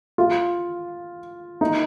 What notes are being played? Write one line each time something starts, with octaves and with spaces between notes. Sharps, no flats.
F4
D#4